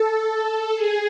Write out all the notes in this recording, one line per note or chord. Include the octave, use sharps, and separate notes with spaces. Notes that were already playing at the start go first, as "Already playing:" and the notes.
Already playing: A4
A4
G#4